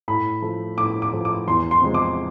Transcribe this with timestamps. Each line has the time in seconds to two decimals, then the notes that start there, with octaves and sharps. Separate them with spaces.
0.08 A2 B5
0.42 F3 A3
0.78 A2 D6
1.02 D6
1.13 F3 A3
1.25 D6
1.48 E2 C6
1.71 C6
1.82 C3 F3 G#3
1.94 D6